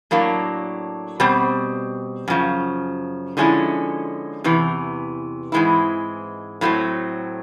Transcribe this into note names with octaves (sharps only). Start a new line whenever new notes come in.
A2 F#3 A#3 D4
B2 G3 C4
F#2 C#3 F3
D3 F3 G#3 C#4 E4
E2 C3 E3
G#2 E3 G#3 C4 E4
A2 F#3 A3 C4